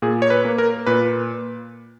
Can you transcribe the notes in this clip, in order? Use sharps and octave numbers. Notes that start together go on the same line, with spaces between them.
A#2 G#4
C#5
B4
A#3
A#4
A#2 B4